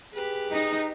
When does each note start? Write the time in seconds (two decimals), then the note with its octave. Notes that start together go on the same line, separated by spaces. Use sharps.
0.14 G4 G#4 B4
0.52 D#4